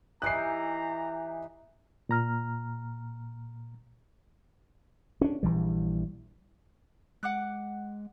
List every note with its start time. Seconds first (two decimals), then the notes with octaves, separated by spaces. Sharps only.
0.22 E3 D#4 G4 E5 G#5 A#5 F#6 C7
2.09 A#2 A#5 F6
5.21 C#4 D4
5.43 A#1 E3 G3
7.23 G#3 F#5 D6 F#6